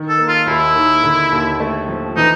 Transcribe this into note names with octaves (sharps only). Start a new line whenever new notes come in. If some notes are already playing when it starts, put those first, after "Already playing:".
Already playing: D#3
A4
A#3
F4
D#2 E4
D#3
D3
D#2
A3
F3
E3 D#4